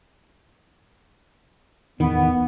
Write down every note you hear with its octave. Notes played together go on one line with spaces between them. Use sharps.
D1 E2 D#3 B3